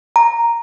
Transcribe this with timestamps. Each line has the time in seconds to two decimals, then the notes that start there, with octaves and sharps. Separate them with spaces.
0.16 A#5